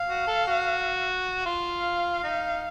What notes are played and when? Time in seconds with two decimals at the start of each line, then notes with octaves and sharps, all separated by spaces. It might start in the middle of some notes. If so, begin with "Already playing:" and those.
Already playing: F5
0.08 F#4
0.28 A4
0.47 F#4
1.46 F4 F5
2.24 D#4